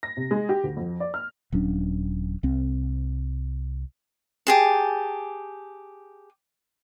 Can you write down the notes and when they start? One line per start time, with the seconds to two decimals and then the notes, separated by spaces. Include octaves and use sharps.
0.03 A#6
0.17 C3
0.31 G#3
0.49 G4
0.64 D2
0.77 F2
1.00 D5
1.14 F6
1.52 D#1 F#3 C#4 D4
2.43 C2 C4
4.47 G4 G#4 A5